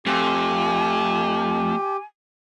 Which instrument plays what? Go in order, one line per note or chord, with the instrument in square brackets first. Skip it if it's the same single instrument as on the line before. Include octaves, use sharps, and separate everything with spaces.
[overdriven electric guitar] F2 [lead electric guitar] A3 [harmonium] G4 [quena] G#5